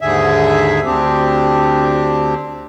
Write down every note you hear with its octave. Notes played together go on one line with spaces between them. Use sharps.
D#2 G#2 D3 G#4 E5
D2 C4 D4 G4